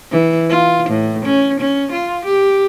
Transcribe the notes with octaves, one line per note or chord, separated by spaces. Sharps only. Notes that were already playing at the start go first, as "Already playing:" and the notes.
E3
F4
A2
C#4
C#4
F4
G4